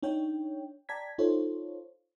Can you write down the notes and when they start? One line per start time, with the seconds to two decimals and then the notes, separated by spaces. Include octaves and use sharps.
0.03 D4 D#4 C#5 G5
0.89 D5 G5 A5 A#5 G#6 B6
1.18 D#4 F4 A4 C5 C#5